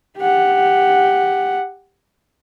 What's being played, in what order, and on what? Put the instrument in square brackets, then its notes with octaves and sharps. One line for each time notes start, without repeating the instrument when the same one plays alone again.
[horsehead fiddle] G4 F#5